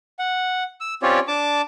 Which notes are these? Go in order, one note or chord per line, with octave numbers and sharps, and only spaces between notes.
F#5
E6
C4 C#4 F4 G4 C#5 D5
D4 A5 D6